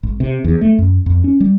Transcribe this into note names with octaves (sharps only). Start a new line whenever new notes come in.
G#1
C3
E2
A3
F#2
F2
C#4
G3